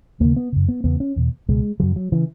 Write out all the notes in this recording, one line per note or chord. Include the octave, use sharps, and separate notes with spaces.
D#2 C#3 A#3
B3
F#2 C#3
B3
E2 C#3 B3
C#4
E2 B2
C#2 B2 G#3
F#2 C#3 F#3
F#3
C#3 E3